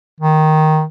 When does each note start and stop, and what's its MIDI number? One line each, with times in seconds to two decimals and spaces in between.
0.20 0.84 51